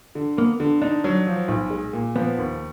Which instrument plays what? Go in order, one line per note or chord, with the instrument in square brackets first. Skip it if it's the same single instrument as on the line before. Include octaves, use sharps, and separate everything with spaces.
[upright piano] D3
[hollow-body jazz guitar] A#3 [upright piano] B3
[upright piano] D3
[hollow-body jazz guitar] D4 [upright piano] D#4
[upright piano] F#3
F3
B1
G#3
A#2
[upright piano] F3 [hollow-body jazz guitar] B3
[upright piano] D#2